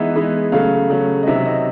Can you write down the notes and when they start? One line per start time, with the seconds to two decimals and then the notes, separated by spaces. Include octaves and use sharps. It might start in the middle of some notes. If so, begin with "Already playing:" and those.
Already playing: E3 G#3 B3 D#4 E5
0.15 E3 G#3 B3 D#4
0.52 C#3 F#3 A3 F5
0.90 C#3 F#3 A3
1.23 D#5
1.27 C3 D#3 F#3 E5
1.45 D#5